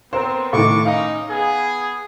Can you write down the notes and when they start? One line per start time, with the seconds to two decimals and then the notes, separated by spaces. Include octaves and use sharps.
0.13 B3 C4 A#4 C5
0.53 A2 D#3 C#6 D6
0.85 C#4 D#4 F5
1.30 B3 G#4